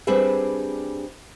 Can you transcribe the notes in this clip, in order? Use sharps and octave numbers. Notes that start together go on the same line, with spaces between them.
G3 C4 D4 G#4 B4 E5